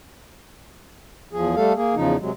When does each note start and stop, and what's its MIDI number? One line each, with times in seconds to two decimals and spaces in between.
1.33 1.55 40
1.33 1.55 53
1.33 1.55 68
1.56 1.73 55
1.56 1.73 57
1.56 1.73 69
1.56 1.73 77
1.76 1.95 58
1.76 1.95 68
1.95 2.16 40
1.95 2.16 49
1.95 2.16 53
1.95 2.16 63
2.20 2.31 48
2.20 2.31 54
2.20 2.31 56